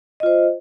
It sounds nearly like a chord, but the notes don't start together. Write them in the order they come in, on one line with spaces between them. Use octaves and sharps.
D#5 F4 C5